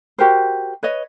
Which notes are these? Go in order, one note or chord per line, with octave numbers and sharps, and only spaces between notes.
F#4 G4 A#4 C5
B4 C#5 D#5